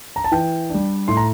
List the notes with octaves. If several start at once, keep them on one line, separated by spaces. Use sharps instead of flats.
A#5
A5
E3 G5
G3 D4
A2 C6
A#5